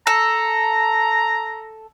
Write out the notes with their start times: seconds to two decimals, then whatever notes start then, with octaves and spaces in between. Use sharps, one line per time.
0.07 A4 A#5